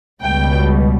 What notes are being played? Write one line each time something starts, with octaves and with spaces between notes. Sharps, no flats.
C#2 B2 G3 G5